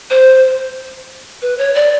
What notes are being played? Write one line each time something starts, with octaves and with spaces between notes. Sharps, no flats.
C5
B4
C#5
D5